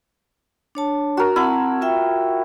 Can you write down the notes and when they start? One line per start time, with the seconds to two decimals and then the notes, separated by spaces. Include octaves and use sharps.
0.75 D4 C#5 A5
1.17 F#4 A#4
1.36 C4 E4 F#5 A5
1.82 F4 E5 G5